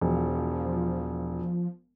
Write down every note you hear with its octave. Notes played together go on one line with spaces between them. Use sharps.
E1 F3